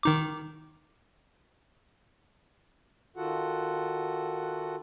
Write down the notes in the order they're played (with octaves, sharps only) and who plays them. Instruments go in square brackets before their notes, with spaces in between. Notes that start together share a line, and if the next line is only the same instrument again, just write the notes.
[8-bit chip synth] D#3 D#4 D6
[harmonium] D#3 F4 F#4 A4 F#5